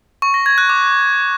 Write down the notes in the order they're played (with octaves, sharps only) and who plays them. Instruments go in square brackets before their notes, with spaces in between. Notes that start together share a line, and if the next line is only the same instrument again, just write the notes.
[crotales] C#6
A#6
G#6
F#6
D6